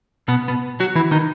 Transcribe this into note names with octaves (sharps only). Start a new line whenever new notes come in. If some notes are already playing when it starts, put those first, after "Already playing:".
B2 B3
B2 B3
F#3 F#4
E3 E4
D#3 D#4